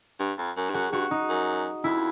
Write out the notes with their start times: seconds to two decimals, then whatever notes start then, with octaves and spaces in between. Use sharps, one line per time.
0.20 G2
0.38 F2
0.57 F#2
0.69 G2
0.74 F#2 F#4
0.93 G2 F#4
1.11 D#4
1.29 F#2
1.84 F2 E4